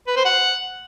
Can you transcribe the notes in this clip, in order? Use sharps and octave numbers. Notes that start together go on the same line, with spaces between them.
B4
C5
F#5